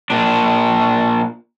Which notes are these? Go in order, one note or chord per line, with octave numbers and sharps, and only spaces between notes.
A#2 D4